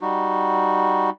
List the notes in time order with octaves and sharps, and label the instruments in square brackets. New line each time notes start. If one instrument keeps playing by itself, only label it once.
[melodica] G3 D#4 F#4